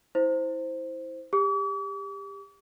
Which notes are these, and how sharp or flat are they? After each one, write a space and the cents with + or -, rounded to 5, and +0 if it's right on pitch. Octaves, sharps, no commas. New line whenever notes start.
E4 -20 C5 +0
G4 +30 D6 -45